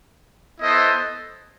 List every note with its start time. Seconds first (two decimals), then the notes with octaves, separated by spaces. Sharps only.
0.60 B3 E4 A4 C5 D#5